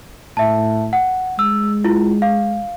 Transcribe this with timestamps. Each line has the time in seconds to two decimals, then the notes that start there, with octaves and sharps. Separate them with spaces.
0.37 A2 E5 A5
0.93 F#5
1.39 G#3 E6
1.85 E4 F4
2.22 F5